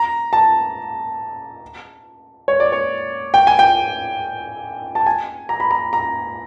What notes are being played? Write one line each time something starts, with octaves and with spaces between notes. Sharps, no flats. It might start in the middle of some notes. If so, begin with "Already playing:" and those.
Already playing: A#5
A5
C#5
D5
C#5
G5
G#5
G5
A5
G#5
A#5
B5
A#5
A#5